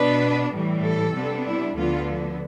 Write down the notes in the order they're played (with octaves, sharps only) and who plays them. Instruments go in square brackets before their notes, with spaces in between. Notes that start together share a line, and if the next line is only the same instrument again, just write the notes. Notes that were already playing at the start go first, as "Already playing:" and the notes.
Already playing: [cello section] B2 B3 D4 B4
A2 E3 G3
A4
C3 G3 B3 D4
E4
D2 D3 F3 B3 F4